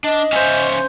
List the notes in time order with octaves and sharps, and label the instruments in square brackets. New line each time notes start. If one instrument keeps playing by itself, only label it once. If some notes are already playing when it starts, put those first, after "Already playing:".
[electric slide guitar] D4 [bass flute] D#5
[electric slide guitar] C#4 E5 F5 [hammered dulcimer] C5 G#5